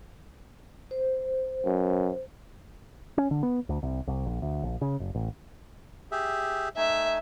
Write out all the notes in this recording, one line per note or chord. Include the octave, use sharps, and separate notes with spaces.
C5
F#2
C#4
D3
B3
D2
C2
C2
A#1
D2
A#1
C#3
F#1
A1
G4 G#4 E5
A3 D#4 E5 G#5